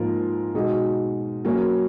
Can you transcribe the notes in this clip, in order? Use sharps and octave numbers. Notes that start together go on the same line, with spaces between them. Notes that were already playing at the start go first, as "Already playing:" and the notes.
Already playing: G#2 F3 A#3 F4 A#4
B2 G#3 D#4 F#4
F#3 A#3 C#4